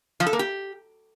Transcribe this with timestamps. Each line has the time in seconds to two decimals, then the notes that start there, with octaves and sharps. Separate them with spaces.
0.20 F3
0.27 A4
0.33 A#3
0.39 G4